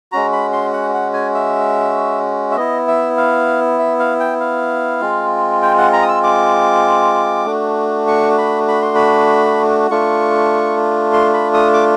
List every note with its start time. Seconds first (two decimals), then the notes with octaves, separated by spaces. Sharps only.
0.12 G#3 C#4 F#4 A#5
0.32 B5
0.52 C6
0.73 F#5
0.94 F#5
1.14 G#5
1.34 E5
2.51 E5
2.56 B3 E4 D#5
2.88 E5
3.17 F5
3.79 E5
4.00 F5
4.20 G5
4.40 F5
5.01 G#3 C4 F4
5.62 G5
5.78 F#5
5.93 A#5
6.02 D#6
6.08 E6
6.23 D6
7.46 A3 D4 F#4
8.08 C#6
8.38 B5
8.68 B5
8.82 C6
8.95 B5
9.91 A3 D4 F4 C#6
11.13 C6
11.34 B5
11.54 D#6
11.74 D6